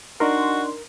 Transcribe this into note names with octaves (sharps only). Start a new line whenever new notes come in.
D4 D#4 F#4 A#4 C6